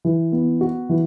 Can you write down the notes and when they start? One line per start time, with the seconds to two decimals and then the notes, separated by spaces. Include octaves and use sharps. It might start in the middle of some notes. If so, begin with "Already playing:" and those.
0.05 E3
0.32 B3
0.61 F#4
0.89 E3